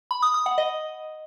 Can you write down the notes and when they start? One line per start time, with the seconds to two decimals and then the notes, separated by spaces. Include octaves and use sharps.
0.11 B5
0.22 D#6
0.34 D#6
0.46 F#5
0.58 D#5